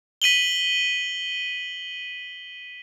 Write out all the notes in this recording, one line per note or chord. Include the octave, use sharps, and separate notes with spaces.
B6 D#7 F#7 G7